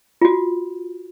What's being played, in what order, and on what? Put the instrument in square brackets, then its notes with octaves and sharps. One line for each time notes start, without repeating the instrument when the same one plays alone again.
[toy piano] F4 F#4